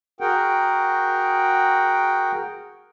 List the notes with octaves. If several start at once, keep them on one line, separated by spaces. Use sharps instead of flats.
F#4 G#4 A#4 F#5 G5